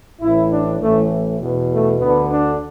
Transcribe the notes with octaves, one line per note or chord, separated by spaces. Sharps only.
A1 A2 E3 E4
D4
A1 A2 E3 A3
E2 B2
A3
D2 D3 B3
D4